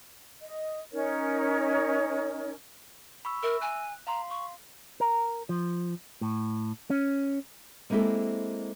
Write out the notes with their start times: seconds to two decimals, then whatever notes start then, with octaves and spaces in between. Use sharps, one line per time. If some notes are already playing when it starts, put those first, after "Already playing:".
0.42 D#5
0.92 C#4 D#4 A#4 C#5
3.25 B5 C#6 E6
3.43 A#4 E5 E6
3.61 G#5 F#6
4.07 F5 A#5 C6
4.30 C#6
5.00 A#4
5.49 F3
6.21 A2
6.90 C#4
7.90 G#3 A#3 C4 E4 G4 A4